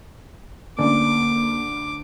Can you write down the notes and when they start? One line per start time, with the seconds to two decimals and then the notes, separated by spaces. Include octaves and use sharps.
0.79 D2 A#3 C#4 D5 D6